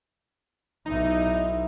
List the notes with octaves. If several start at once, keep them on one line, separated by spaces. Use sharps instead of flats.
B1 D#4 E4